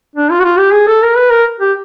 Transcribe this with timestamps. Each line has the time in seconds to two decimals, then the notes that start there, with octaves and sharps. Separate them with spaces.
0.16 D4
0.31 F4
0.40 F#4
0.44 F4
0.59 G4
0.73 G#4
0.88 A4
1.03 A#4
1.17 B4
1.31 A#4
1.60 G4